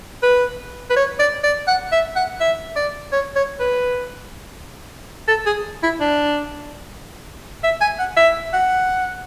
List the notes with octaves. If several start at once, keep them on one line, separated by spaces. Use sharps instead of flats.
B4
B4
C#5
D5
D5
F#5
E5
F#5
E5
D5
C#5
C#5
B4
A4
G#4
E4
D4
E5
G#5
F#5
E5
F#5